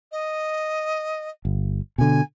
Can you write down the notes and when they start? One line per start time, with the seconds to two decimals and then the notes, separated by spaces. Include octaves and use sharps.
0.12 D#5
1.45 G1
1.98 B2 D3 G#5